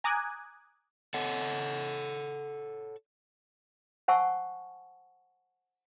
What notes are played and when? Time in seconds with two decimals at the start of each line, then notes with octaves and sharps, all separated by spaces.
0.04 G#5 A#5 D6 D#6 F#6 G#6
1.14 A4 C#5 F#5
4.08 C5 F#5 G#5 A5 C#6 E6